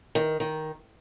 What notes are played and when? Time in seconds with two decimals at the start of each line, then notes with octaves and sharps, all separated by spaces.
0.15 D#3
0.40 D#3